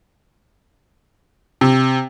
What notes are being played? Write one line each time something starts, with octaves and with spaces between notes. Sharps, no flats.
C3